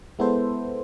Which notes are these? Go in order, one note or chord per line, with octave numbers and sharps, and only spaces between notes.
G#3 B3 E4 A4 C5